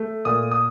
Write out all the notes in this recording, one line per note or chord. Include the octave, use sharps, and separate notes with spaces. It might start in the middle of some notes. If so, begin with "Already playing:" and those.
Already playing: A3
A#2 D#6
D#6